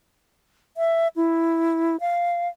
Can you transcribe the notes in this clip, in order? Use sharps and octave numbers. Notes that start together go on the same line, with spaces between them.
E5
E4
F5